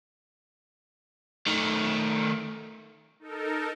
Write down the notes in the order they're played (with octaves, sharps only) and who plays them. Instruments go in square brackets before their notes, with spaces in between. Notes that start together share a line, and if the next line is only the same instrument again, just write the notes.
[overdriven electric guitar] D#3 A3
[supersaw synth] D#4 A4 A#4